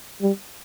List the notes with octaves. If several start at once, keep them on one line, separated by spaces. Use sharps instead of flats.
G3